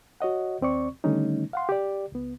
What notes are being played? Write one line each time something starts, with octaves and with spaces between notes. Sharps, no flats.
F#4 C#5 D#5 F#5
D#2 C4 D5 C#6
D3 D#3 G3 A3 C#4 D#4
F5 F#5 C6
G4 D5
C#2 B3